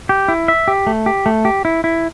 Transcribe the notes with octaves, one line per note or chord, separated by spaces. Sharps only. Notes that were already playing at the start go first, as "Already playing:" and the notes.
G4
E4
E5
G4
A3
G4
A3
G4
E4
E4